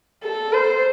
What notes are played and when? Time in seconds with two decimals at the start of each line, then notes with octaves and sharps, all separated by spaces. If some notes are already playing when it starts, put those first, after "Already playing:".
0.23 A4
0.52 C5